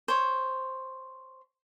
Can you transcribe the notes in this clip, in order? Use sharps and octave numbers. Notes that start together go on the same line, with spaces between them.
C5 C#5